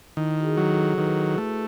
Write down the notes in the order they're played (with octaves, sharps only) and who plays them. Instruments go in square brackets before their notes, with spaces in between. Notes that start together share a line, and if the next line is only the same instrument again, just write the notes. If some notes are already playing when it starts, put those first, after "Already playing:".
[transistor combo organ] D#3 [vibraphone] E4
[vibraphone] F#4
G#4
[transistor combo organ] F#3
[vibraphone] A4
[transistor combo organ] D#3 [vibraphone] B4
[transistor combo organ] A3